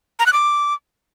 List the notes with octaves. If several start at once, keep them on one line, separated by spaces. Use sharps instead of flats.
A#5
F#6
D6